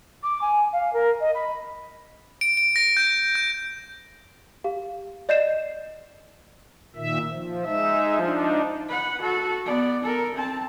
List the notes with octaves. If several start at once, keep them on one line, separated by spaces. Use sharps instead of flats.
D6
G#5
F5
A#4
D#5
B5
D7
D7
A#6
G6
G6
G4 F5
D5 D#5 G6 C7 E7
A#2 D#3 E5
F3
G#3 D#4 E5
F3 D4 D#4
B4 F#5
F#4 A4
B3 D5
A4 A#4
C4 A5